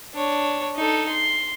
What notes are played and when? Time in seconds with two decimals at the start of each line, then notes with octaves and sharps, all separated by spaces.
0.14 D4 C#5
0.76 D#4 A4
1.08 C6